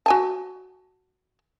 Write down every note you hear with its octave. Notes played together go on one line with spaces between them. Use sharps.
F#4 G#5 A5